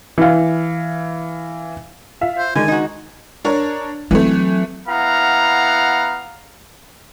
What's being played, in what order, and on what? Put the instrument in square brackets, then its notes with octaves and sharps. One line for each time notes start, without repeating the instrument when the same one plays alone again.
[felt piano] E3 F5
[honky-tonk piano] F4 E5 F5
[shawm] C5
[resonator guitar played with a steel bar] D3 [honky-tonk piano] D#3 G#3 [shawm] G#5
[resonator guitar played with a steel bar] D#4 F#4
[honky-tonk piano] D4 A#4 C#5
[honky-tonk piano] E3 A3 [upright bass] F#3 C4
[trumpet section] B3 E4 F5 F#5 A#5